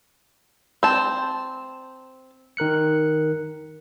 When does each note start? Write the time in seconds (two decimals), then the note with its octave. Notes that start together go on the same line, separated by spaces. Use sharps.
0.83 C4 A5
2.57 D#3 A#4 F#6 C#7